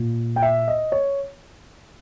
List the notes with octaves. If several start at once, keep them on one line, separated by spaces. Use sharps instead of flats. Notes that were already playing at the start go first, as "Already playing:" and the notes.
Already playing: A#2
G5
E5
D#5
C#5